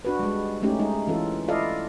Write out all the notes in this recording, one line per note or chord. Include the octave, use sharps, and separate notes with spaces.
D4 F#4 B4
G3 G#3
G#3 A3 C#4 D#4 G4
G#3 D#4
E3 C#4 F4 A4
E4 F4 A4 D5 D#5 F5